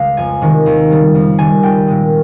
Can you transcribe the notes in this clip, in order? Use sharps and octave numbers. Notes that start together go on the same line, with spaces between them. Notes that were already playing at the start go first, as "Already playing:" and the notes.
Already playing: C#2 C#3 G#3 F5
F2 G#5
C3 D#3 G#3
D#2
C#3 G3
F2
D#3 G3 G#5
C2 G5
A#2 G#3